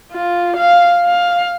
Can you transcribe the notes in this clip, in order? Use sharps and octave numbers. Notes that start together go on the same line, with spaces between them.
F4
F5
F5